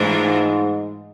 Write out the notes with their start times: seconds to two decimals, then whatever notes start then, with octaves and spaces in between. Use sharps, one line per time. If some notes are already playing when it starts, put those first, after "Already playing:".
Already playing: G#2 E3 A3 D4 F4 A#4